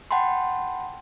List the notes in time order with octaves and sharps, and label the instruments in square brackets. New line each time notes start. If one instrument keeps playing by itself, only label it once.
[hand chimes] F#5 G5 A5 B5 C6